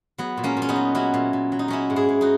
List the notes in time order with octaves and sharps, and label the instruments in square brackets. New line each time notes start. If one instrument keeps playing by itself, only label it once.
[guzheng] F#3 B3
A#2
A#3 C#4
A#2
C#4
B3 D#4
F#3
F#3 C#4 E4
A#2
A#2
F#3
D#4
F#3 C#4 E4
G#2
E4 G#4
G#2
D#4 F#4